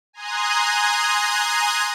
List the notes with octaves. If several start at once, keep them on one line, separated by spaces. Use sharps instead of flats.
G#5 A#5 C6 D#6 F#6 G#6